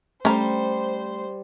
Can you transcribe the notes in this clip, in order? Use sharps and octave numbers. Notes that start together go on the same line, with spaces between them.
G3 A3 C#4 C5 A#5